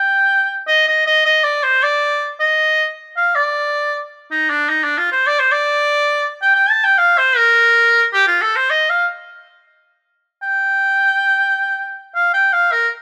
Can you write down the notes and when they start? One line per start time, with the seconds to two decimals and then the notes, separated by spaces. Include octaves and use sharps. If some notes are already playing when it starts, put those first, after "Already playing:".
Already playing: G5
0.67 D#5
0.87 D#5
1.07 D#5
1.25 D#5
1.44 D5
1.63 C5
1.83 D5
2.40 D#5
3.16 F5
3.35 D5
4.31 D#4
4.50 D4
4.69 D#4
4.84 D4
4.98 F4
5.12 C5
5.27 D5
5.40 C5
5.52 D5
6.42 G5
6.55 G5
6.70 A5
6.84 G5
6.98 F5
7.18 C5
7.36 A#4
8.13 G4
8.27 F4
8.41 A4
8.56 C5
8.70 D#5
8.89 F5
10.42 G5
12.15 F5
12.33 G5
12.53 F5
12.72 A#4